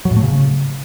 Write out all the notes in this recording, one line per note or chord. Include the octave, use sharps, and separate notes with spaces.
F#3
A2
A3
C#3